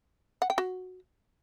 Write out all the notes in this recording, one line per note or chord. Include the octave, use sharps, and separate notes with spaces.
F#5
G5
F#4